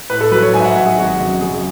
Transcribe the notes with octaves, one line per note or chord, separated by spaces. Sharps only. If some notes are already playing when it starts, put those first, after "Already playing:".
A2 B4
A4
F#3 B4
C#5
G#2 G#5
E5
F#5
F#3 E5
G#4
G#1 F#4
F#2
F#2 G#4